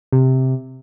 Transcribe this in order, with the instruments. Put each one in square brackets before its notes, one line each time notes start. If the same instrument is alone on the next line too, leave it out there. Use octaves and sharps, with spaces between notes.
[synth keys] C3